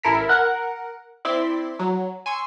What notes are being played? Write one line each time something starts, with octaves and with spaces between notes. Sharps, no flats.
A1 E4 A4 A#4 F6 B6
A#4 F#5 F#6
C4 E4 D5 C6 D6 B6
F#3
G#5 C6 C#6 E6